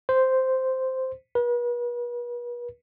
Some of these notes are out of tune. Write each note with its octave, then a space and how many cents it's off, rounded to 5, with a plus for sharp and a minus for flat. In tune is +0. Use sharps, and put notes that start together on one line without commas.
C5 -5
B4 -40